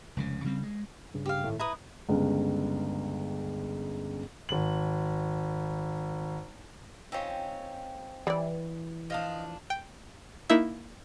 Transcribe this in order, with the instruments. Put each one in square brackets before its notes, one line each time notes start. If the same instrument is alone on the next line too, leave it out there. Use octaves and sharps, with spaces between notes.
[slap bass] F1 C#2 C#3
C#3 G3 C4
G#3
[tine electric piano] G2 C#3
[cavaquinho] G4 F5
[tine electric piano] G#1 A2 A3
[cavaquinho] E4 B4 D#6 [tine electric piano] A#5
[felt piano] G1 C#2
[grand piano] G#1 F#7
[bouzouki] C4 C#4 C#5 [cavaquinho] D#4 F4 C#6
[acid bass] E3 [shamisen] G3 D5
[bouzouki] F3 D4 [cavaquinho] D#5 F5 D#6
[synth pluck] G5
A#3 D#4 E4 E5